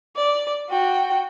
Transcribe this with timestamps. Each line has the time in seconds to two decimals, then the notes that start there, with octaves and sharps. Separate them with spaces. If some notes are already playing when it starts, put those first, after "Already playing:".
0.16 D5
0.69 F#4 G5